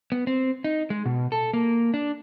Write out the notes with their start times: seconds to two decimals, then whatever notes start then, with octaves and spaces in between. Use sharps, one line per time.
0.12 B3
0.27 C4
0.64 D#4
0.90 G#3
1.06 B2
1.32 A4
1.53 A#3
1.94 D4